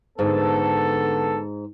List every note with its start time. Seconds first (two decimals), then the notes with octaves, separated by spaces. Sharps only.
0.19 G#2 D3 B3 A4